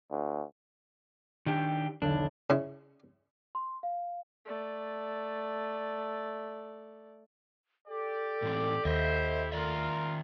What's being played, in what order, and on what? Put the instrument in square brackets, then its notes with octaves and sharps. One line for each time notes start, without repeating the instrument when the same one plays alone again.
[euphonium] D2
[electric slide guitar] D#3 D4 G4
[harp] B1 E2 D3 [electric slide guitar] D4
[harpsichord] C#3 E4
[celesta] C6
F5
[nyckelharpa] A3 D5
[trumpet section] G4 D5 [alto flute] A4
[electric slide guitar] A2 E3 C4
[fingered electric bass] D#2 [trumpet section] E4 G4 C5 [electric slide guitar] D#5 E5
[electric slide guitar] D#3 D5 E5 [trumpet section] F4 A#4